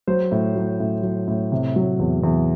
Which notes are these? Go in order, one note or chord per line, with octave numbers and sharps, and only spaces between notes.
F#3 C5
A2
F#3
A2
F#3
A2
C3
F#3
E2
E2